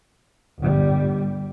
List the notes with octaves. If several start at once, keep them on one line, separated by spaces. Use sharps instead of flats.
G1 G3